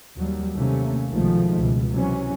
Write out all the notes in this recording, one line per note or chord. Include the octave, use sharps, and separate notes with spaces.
D#2 F#3 G3
D#2 C3 A3 A#3 C#4
B1 B2 D#3 F3 G#3 A3
C#2 B2
C3 E3 F#3 C#4